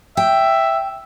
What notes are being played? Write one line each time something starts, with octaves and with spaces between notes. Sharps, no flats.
E5 G5